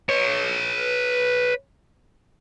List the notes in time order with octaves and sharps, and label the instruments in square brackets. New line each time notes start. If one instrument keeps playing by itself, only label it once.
[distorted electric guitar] B4 C#5